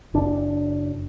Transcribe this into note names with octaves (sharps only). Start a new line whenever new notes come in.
F#1 D4